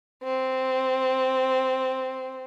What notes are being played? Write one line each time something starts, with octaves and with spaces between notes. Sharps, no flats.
C4